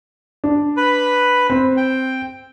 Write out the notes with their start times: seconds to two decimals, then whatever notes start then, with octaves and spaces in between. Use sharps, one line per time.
0.44 D4
0.77 B4 B5
1.50 C4
1.77 G5